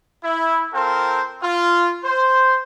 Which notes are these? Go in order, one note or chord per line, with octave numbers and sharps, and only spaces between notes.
E4
C4 F4 A4 A#4 C5
F4
C5